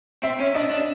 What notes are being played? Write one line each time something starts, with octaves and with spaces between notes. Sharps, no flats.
C4 E5
C#4
D4 D#5
D4